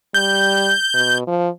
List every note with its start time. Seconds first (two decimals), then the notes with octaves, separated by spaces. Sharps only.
0.14 G3 G6
0.94 B2
1.27 F3